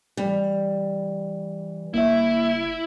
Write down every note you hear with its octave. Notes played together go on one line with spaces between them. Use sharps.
E3 G3
F#1 A#3 E4 E5